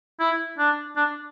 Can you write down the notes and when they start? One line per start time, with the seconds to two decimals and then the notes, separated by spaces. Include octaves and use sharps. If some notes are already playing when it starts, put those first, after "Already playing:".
0.20 E4
0.58 D4
0.96 D4